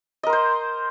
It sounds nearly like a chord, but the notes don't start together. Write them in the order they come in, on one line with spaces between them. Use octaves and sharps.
D#5 A#4 C6 C5